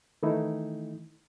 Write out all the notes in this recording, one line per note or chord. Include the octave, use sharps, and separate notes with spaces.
D#3 E3 A3 D#4 E4